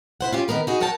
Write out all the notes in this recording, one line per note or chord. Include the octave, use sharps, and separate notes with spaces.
E4 C5 F#5
C#4 F4 G4
D#3 A#3 B3 A#4 B4
D#4 F#4 G#4
F#3 A#4 F#5 G5 A5